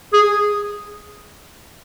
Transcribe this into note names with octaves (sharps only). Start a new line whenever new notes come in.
G#4